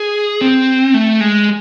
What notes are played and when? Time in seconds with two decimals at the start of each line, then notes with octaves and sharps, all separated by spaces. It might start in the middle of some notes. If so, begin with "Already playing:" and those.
Already playing: G#4
0.41 C4
0.94 A3
1.21 G#3